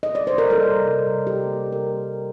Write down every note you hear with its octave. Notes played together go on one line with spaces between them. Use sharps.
D#5
D5
C5
A#4
G3 A4
C3
C3
C3
G3 G4
A#3
G3
A#4